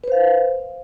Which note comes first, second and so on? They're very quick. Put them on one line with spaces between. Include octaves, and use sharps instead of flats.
B4 C5 F5